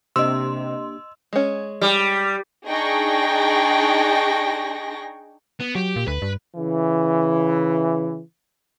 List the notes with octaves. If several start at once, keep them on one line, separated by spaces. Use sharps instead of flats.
C3 A#3 D4 G4 D#5 C6 E6
G#3 C#4
G3
D4 D#4 G#4 G5 C#6 A#6
B3
F#3 G4
A#2
D2 B4
G2
C#3 E3